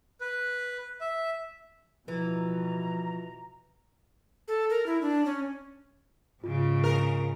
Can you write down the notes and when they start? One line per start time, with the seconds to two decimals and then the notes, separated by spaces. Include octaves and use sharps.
0.21 B4
1.01 E5
2.08 B2 E3 F3 A#5
4.48 A4
4.70 A#4
4.86 E4
5.01 D4
5.26 C#4
6.44 G#2 C#3 F4
6.84 A#4